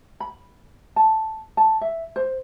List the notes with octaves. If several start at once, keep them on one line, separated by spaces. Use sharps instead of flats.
B5
A5
A5
E5
C5